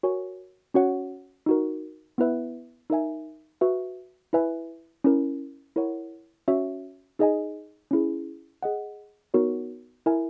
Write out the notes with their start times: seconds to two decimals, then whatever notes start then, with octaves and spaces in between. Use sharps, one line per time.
0.03 F#4 A#4 C#5 G#5
0.74 C#4 F#4 C#5 F#5
1.46 D#4 F#4 A#4
2.18 B3 E4 B4 E5
2.90 D#4 A#4 E5 G#5
3.61 F#4 B4 E5
4.33 E4 B4 E5 G#5
5.04 C#4 E4 A#4
5.76 E4 A#4 C#5 F#5
6.48 C#4 F#4 C#5 E5
7.19 D#4 G#4 D#5 G#5
7.91 C#4 E4 G#4
8.63 G#4 D#5 F#5
9.34 B3 D#4 F#4 A#4 C#5
10.06 E4 A#4 E5 G#5